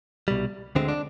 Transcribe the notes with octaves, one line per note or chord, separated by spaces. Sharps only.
C2 B2 G3
D2 D3 G#3 C4
D4